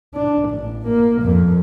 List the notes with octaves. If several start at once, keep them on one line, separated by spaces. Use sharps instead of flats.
D4
A1
A#3
F2